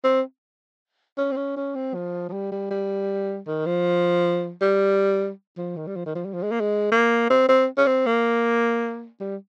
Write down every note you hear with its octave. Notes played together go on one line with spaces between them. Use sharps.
C4
C#4
C4
C#4
C#4
C4
F3
F3
G3
G3
G3
D#3
F3
G3
F3
D#3
G3
F3
D#3
F3
G3
F3
G#3
A#3
G#3
A#3
C4
C4
C#4
C4
A#3
G3